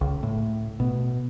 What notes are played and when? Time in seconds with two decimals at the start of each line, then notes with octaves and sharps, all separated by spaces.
0.01 C#2
0.23 A2
0.80 B2